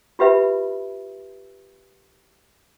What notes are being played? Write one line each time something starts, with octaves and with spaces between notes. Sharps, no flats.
F4 G4 B4 E5 B5